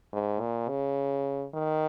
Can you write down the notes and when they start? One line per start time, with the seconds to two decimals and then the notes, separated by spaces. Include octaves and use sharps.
0.13 G#2
0.41 A#2
0.69 C#3
1.54 D#3